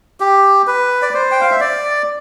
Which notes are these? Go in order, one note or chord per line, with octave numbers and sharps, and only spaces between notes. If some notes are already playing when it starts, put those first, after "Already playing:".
G4
B4
D5
C5
G5
F5
E5
D5